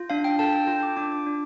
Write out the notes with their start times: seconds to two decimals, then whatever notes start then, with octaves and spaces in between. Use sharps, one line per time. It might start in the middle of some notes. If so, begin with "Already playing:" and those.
Already playing: F4
0.10 D4 F5
0.24 G5
0.39 A4 A5
0.53 G5
0.67 F4 A5
0.83 D6
0.97 D4 D6
1.12 D6
1.26 D4